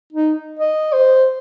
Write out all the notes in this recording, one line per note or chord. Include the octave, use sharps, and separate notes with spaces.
D#4
D#5
C5